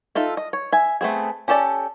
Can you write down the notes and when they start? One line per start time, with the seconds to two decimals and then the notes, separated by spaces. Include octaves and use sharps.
0.15 D#4 F4 A4 E5
0.37 D#5
0.53 C#5
0.72 E5 G#5
1.01 A3 B3 C4 G#4
1.48 C#4 G4 A4 D5 A5